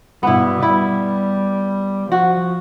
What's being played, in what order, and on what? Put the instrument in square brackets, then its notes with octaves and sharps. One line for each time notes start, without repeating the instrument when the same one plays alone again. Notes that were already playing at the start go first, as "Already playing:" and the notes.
[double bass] G2 B2 [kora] B3 E4
[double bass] G3 [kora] E4
[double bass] F3 [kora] F#4